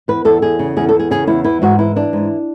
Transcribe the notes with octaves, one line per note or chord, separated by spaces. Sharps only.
E2 B4
E2 A4
E2 G#4
C#3
E2 G#4
A4
E2
G#4
C#3 G#4
E2 E4
E3 E4
G#2 F#4
E3 E4
E3 D4
G#2